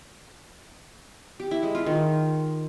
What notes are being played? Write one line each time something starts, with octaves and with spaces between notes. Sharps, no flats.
G4
E4
G#3
F4
D#3